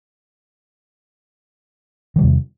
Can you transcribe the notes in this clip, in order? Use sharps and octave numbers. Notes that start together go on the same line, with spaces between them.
E2 C3 D#3 G3